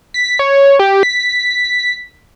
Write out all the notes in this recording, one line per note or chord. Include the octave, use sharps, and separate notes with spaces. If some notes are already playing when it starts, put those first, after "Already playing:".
B6
C#5
G4
B6